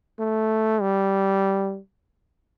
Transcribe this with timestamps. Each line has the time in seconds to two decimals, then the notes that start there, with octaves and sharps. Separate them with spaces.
0.19 A3
0.81 G3